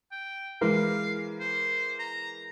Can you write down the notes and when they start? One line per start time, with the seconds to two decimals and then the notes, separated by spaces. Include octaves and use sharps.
0.12 G5
0.61 E3 G#3 A#4 F5
1.40 C5
1.99 A#5